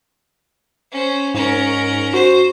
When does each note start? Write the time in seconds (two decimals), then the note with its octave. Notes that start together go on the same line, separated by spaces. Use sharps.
0.91 C#4 C5
1.34 G#2 C#4 A#4
2.14 F#4 C5